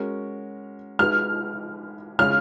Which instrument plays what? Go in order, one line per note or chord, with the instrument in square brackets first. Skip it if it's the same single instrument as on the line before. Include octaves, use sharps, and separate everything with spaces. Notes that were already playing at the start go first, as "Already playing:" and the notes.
Already playing: [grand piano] G#3 C#4 F#4 A#4
[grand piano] G#3 D#4 F#4 B4 [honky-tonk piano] F6
[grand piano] C#3 G#3 C#4 F4 [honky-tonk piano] F6